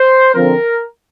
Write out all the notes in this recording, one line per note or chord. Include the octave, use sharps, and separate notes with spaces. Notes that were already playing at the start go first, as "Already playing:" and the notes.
Already playing: C5
D3 F3 C4 A#4